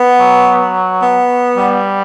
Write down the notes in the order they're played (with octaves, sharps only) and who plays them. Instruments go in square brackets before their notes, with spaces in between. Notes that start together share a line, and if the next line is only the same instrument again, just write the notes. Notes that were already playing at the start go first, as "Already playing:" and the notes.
Already playing: [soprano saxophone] B3
[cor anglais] F#3
[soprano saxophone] B3
[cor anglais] G3